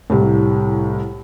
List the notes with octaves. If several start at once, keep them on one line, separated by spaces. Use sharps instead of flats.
C2 A2